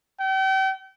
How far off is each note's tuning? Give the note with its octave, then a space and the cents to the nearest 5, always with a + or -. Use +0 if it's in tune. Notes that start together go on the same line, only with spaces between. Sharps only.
G5 -40